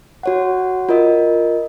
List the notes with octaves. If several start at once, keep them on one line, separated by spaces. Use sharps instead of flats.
F#4 C#5 F#5
F4 A#4 D#5